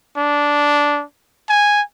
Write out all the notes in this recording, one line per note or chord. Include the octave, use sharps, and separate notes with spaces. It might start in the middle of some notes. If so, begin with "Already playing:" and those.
D4
G#5